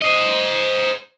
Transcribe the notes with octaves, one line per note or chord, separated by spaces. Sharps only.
C5 D#5